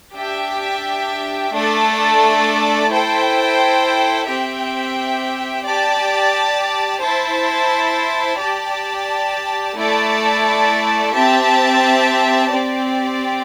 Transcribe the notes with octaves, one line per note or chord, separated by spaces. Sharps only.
D4 G4 E5 G5
A3 D4 A4 D5 A5
E4 A4 C5 G5
C4 G4 E5 G5
G4 D5 A5
E4 C5 A5
G4 D5 A5
A3 E4 A4 D5 A5
C4 G4 E5 A5
C4 G4 D5